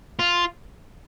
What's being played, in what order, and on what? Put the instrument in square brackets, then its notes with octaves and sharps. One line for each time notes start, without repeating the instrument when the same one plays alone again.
[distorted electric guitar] F4